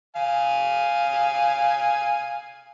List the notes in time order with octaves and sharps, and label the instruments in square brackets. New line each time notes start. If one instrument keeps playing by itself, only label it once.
[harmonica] F5 G#5